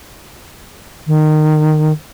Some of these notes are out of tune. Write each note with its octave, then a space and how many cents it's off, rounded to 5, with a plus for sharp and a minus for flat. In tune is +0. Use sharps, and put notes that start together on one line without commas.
D#3 -20